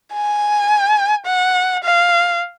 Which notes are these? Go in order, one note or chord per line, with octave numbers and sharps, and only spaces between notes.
G#5
F#5
F5